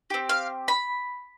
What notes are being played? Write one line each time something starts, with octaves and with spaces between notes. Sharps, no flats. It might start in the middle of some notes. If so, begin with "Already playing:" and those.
C4 G4
F5
B5